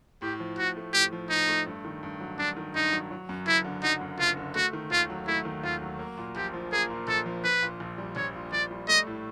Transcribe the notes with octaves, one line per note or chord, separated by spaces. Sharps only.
A2 G4
F3
A2 F#4
A3
A2 G4
F3
A2 D#4
A3
G2
D#3
G2
F#3
G2 D4
D#3
G2 D#4
F#3
F#3
F#2
F#1 E4
D3
F#3 D#4
F#2
F#1 F4
D3
A3 F#4
D#3
D#2 F4
F#3
A3 E4
D#3
D#2 F4
F#3
A#3
A#2
A#1 G4
F3
A#3 G#4
A#2
A#1 A4
F3
A#1 B4
A#2
A#1
G3
A#1 C#5
A#2
A#1 D5
G3
A3 D#5
A2